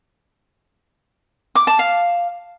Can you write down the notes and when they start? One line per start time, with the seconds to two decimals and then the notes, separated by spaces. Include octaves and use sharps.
1.55 D6
1.67 A5
1.79 F5